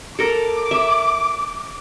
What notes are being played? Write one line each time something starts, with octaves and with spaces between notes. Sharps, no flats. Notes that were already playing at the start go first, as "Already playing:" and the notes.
A4 A#4 D6
E5